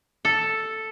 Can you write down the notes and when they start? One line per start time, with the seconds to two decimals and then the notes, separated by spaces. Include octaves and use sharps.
0.25 A4